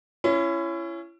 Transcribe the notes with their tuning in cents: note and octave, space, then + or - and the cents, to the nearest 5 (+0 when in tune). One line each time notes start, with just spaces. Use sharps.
C#4 +0 E4 +35